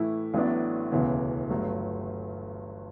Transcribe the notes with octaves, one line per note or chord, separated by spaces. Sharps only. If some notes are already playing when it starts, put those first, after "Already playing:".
Already playing: A2 E3 A3 E4
A1 A2 F#3 B3 D4
E1 D2 C#3 E3 B3
G1 G2 F#3 A3